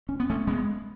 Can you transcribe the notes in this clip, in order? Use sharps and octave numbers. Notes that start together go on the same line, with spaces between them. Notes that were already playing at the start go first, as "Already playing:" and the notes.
C#4
B3
A3 C#4
G#3 B3